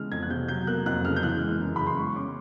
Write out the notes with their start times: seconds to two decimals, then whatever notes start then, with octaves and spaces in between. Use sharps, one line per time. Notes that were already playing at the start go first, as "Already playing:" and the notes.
Already playing: C#3 E3 G#3 F6
0.12 F2 G#6
0.23 F#6
0.30 C3 G6
0.48 F#3 G6
0.67 A#3 F#6
0.86 F2 F#6
1.04 C#3 F6
1.16 G6
1.23 E3 F#6
1.41 G#3
1.60 F#2
1.76 C#3 B5
1.87 C6
1.97 G#3 C#6
2.16 C#4 D6